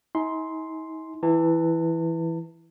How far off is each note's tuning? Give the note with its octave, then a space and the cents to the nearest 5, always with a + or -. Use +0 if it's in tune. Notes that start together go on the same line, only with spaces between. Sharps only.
D#4 +45 G#5 +25 C6 +0
E3 +0 A5 +40